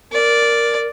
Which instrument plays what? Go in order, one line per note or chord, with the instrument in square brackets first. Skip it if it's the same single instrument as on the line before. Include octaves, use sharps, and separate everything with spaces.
[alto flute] A#4 [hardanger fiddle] D5